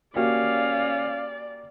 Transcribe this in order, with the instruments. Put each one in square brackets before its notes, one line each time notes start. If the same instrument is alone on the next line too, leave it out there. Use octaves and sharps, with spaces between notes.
[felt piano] A#3 F#4 G4 [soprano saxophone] C#4 [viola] D5 [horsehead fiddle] F5